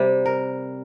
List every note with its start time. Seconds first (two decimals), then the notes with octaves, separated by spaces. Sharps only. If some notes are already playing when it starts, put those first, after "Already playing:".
Already playing: C3 G3
0.26 A#4